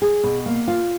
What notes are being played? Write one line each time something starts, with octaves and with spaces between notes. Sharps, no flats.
G#4
B2
A#3
F4